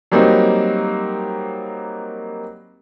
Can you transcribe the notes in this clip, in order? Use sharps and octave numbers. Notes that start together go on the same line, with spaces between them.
F#3 G3 A#3 C4 D#4